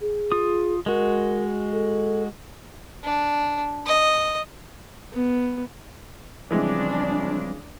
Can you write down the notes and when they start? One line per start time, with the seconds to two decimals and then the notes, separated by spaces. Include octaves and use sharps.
0.01 G#4
0.32 F4 D#6
0.86 G#3 F#4 A#4
1.72 A4
3.04 D4
3.86 D#5
5.13 B3
6.51 C#2 C#3 E3 F3 G3 G#3 C4 D4